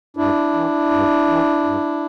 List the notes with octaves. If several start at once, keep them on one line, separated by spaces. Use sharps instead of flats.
G2 D4 E4
E3
G2
E3
G2